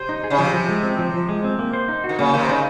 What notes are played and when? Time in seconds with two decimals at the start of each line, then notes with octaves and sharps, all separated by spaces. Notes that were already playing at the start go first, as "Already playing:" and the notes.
Already playing: C3 C5
0.09 D#4
0.24 G#4
0.30 C#3
0.39 C3 F3
0.54 F3
0.69 G#3
0.83 C4
0.99 F3
1.14 F3
1.29 G#3
1.44 C4
1.59 A#3
1.74 C5
1.89 D#4
2.04 F#4
2.09 D#3
2.19 C#3 A#3
2.34 C3 D#3 C5
2.49 C#3 D#4